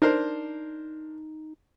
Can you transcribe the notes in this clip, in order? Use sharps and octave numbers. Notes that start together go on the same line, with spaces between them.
D4 D#4 A#4 C5